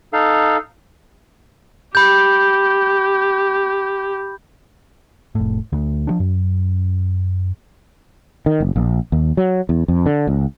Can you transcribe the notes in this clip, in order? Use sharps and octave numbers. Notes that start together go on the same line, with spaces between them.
D#4 A4 F5
G4 B5 G6
F1 A2
D2
F3 D4
F#2
D#3
F#1
A#1
D#2
F#3
E2
F2
D3
C#2